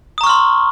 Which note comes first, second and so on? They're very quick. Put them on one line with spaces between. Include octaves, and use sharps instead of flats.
D#6 A#5 C#6 F6 C6